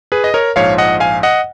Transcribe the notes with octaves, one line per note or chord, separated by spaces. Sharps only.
G#4 B4
D#5
A#4 C#5
A#1 G#2 F3 C#5 F5
D#5 F#5
F5 G#5
D#5 F#5